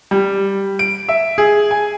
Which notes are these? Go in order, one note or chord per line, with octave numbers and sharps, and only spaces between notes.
G3
D7
E5
G#4
G#5